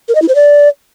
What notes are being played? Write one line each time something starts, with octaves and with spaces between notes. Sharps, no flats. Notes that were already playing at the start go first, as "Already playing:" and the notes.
A#4
D#5
E4
C5
D5